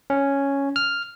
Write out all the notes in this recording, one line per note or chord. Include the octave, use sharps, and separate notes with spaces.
C#4
F6